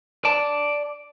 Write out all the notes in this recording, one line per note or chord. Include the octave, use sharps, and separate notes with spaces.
D5 A5